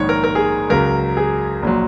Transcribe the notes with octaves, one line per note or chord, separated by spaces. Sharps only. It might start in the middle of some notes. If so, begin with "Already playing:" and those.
Already playing: A#1 G#2 D#3 C#5
A#4
A#4
G#4
C#2 C#3 F#3 A#4
G#4
A#1 A#2 F#3